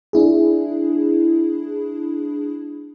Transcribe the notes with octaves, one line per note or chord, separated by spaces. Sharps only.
D4 E4 G#4